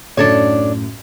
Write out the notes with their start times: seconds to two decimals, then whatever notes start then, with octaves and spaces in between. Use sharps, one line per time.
0.17 F#2 A2 D4 A4 C#5